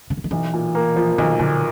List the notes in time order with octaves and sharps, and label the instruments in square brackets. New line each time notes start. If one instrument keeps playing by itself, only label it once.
[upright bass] C#3
D3
D#3
[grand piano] B1 [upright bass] E3
[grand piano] A#2
A#3
F3
[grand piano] B1 [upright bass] D#3
[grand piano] A#2 [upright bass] D3